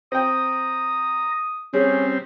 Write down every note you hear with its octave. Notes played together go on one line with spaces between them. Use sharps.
C4 G5 A#5 D#6
G3 C4 C#4 G#4